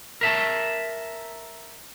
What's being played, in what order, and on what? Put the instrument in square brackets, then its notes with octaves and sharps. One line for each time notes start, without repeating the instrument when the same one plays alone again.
[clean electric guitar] A#4 E5 A5